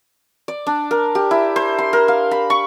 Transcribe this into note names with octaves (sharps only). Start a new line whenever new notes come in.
D5
D4
A#4
G4
E4
C5
C6
A#4
F5
B5
C#6